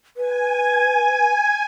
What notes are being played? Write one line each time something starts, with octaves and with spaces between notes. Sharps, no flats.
B4 G#5